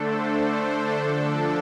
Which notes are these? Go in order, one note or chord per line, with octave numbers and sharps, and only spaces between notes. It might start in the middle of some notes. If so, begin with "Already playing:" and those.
Already playing: D3 A3 D4 A4 C5
C5
A4
D3 F3 D4 A4